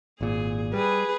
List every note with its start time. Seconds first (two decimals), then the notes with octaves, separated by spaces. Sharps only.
0.21 G#1 A#2 G#4
0.74 G3 G#4 B4